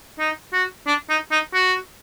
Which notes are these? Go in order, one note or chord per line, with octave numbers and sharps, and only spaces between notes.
D#4
F#4
D4
D#4
D#4
F#4